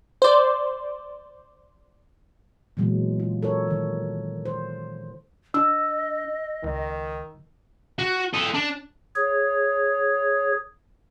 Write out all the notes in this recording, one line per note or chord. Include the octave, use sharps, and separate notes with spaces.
C5 D5
A#2 E3 F#3 G#3 B3
F4
A4 A#4 C#5
D#3 F#3
C5
D4 D#5 E6
C#2 D#3
F#4
A4 D#5
D4
G#4 C#5